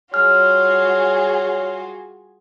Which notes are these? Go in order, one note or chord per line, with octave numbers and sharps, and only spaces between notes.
G3 F4 F#4 G#4 C#5 F6